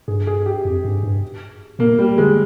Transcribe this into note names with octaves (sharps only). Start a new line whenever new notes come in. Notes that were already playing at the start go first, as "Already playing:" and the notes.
G2 G#4
G#4
G4
F2
G2
G2
A#2 A#3
G3
D3 G#3